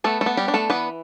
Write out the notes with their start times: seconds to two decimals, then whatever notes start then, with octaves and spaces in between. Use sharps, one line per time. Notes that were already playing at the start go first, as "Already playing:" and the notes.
0.04 A3 B3 A4
0.21 A3 A4
0.26 B3
0.37 G3 G4
0.48 D4
0.54 A3 A4
0.70 E3 B3 B4